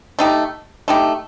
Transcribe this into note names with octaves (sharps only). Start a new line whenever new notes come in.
A3 D#4 G4
A3 D#4 G4